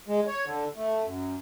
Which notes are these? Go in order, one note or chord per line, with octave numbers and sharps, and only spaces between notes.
G#3
C#5
D3
A3
F#2